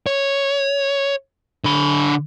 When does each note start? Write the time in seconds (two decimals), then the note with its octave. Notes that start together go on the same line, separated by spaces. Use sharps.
0.06 C#5
1.64 D3 B5